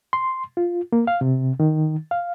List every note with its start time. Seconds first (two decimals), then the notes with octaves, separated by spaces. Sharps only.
0.13 C6
0.57 F4
0.92 A#3
1.07 F5
1.21 C3
1.60 D#3
2.11 F5